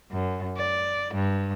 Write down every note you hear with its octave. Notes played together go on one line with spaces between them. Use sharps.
F#2
D5
G2